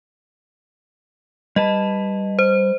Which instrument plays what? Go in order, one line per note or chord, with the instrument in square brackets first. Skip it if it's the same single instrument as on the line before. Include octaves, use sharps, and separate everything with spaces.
[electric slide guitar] G3 B4 A5 [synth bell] D#5
[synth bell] C5